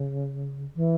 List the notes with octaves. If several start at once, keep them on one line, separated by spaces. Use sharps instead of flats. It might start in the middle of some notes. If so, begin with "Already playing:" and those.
Already playing: C#3
E3